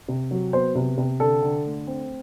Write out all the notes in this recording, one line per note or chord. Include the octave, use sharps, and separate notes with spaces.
C3
F#3
B3 C5
C3
C3
D3 A4
D3
A3
C4